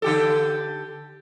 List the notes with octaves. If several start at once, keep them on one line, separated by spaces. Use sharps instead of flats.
D3 G4 A4